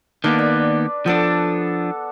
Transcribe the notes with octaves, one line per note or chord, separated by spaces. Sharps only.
D#3 A#3 B3 D4 B4 D5
D4
F3 B3 D4 A4